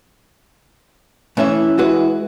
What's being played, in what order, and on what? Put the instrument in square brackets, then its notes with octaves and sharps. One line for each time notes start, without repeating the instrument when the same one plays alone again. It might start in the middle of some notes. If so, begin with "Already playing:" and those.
[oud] E3 [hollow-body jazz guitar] A3 C#4 E5
[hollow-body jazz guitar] G#3 F#4 B4